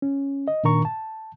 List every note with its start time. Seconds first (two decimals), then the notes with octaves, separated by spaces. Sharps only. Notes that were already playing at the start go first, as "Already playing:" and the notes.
0.02 C#4
0.48 D#5
0.64 A#2 D#3 D4 A#4 A#5 C#6
0.85 A5